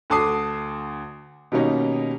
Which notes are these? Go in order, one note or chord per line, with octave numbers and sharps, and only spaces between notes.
D2 D3 A5 D6 D#6 C7
B2 D#3 G3 A#3 C#4 D#4